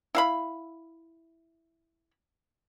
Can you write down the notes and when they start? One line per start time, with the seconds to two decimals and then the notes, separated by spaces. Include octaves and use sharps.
0.15 E4 F5 B5